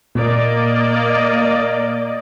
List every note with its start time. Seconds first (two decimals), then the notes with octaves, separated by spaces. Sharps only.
0.15 A#2 A#3 D5 D#5